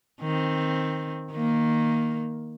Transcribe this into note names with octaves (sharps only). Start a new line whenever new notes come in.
D#3 C4
D#3 A#3